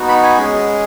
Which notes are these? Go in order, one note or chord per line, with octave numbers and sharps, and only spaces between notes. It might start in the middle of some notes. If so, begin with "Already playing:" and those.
Already playing: B3 D#4 F#4
B5
G#5
G#3 C#4 G#4